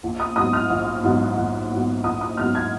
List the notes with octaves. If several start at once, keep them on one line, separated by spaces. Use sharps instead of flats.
A#1
D#6
G#2 F#3 B3 D#6
F6
A#1
G#2 F#3 B3
A#1
G#2 F#3 B3
A#1 D#6
D#6
G#2 F#3 B3 F6
G#6